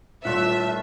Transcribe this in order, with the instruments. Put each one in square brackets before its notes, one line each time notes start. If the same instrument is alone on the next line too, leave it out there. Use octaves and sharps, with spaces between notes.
[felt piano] D#1 [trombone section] A2 A3 [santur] D4 F4 F#5 [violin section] E5